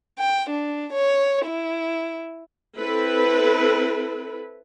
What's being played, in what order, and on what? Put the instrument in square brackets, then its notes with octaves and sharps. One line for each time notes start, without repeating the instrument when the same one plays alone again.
[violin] G5
D4
C#5
E4
[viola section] C4 E4 A4 B4